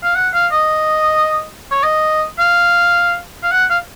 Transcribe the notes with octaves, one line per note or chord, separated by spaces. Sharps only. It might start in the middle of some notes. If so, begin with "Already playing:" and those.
F5
F#5
F5
D#5
C#5
D#5
F5
F5
F#5
F5